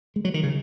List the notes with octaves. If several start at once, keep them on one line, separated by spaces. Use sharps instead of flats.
G#3
F#3
D#3
C#3